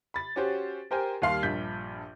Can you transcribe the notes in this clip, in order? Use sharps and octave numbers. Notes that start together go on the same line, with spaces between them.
B5 A6
C#4 F#4 G4 C5
G4 A#4 C5 G5 G#5
D#2 G3 F5 C6
A#1 G2 G6 B6